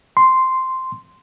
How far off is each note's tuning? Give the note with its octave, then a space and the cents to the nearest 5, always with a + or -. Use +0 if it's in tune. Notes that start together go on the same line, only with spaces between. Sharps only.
C6 -5